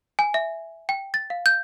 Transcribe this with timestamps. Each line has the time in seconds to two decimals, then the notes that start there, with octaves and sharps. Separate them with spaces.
0.19 G#5
0.34 E5
0.89 G5
1.14 A6
1.30 F5
1.46 G6